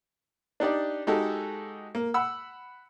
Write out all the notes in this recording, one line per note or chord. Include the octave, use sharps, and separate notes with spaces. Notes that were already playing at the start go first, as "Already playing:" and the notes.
D4 D#4 G4 D5
G#3 D#4 F#4 G4 A4
A#3
F#5 B5 E6